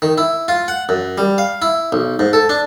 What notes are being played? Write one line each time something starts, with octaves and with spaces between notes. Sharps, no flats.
D#3
E4
F4
F#5
F#2
G3
F5
E4
B1
G#2
A4
D4